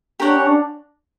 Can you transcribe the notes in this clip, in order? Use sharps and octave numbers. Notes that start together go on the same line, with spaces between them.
D4 G4 A#4 C#5 F#5
C#4
D4